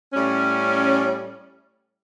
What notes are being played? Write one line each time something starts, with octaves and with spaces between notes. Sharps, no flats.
A2 G3 C#4